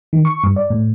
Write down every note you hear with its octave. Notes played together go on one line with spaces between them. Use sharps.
D#3
C#6
G2
D5
A2